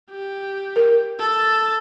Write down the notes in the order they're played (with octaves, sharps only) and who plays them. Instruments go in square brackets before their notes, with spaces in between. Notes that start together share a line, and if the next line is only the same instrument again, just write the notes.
[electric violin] G4
[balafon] A#4
[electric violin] A4 A5